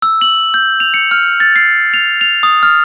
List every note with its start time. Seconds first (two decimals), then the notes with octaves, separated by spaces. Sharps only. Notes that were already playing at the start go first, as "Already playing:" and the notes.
0.02 E6
0.21 F#7
0.54 G6
0.80 F7
0.94 C#7
1.11 F6
1.40 A6
1.56 C7
1.94 F7
2.21 F7
2.43 D#6
2.63 F6